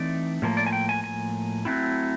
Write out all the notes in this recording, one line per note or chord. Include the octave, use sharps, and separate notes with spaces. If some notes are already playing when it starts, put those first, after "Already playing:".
Already playing: E3 A3 C4 D#4 D5
A2 F3 A#3
D5
G#5
G5
G#5
G#5
F#3 A3 C4 E4